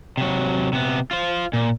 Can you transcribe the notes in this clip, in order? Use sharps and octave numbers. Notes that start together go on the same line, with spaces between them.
C3 F#3
C3 B3
F4 C5
A#2